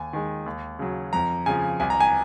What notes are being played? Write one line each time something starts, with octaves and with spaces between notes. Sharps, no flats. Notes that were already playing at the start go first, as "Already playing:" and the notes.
Already playing: D#2 G#5
D#3 G#3
D#2
C#3 F#3
F2 A#5
C#3 F3 G#5
C2 G#5
A#5
G#5